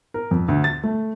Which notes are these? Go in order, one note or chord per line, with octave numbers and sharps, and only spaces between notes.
A#4
F2
D2
A6
A3